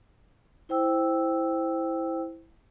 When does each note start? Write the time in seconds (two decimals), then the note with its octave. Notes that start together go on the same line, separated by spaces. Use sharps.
0.69 E4 C5 G5 E6